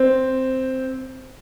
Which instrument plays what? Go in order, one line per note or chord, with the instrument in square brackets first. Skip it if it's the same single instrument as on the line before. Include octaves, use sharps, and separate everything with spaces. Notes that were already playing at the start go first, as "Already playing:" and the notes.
Already playing: [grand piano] C4